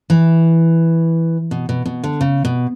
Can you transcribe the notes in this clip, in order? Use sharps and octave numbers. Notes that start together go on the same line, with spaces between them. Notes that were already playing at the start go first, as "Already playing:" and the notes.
E3
B2
B2
B2
D3
C#3
B2